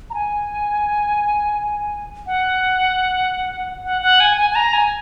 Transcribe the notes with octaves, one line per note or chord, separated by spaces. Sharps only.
A#5
G#5
F#5
F#5
F#5
G#5
G#5
G#5
A#5
G#5